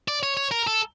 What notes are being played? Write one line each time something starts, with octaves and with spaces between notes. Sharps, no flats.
D5
C#5
C#5
A#4
A4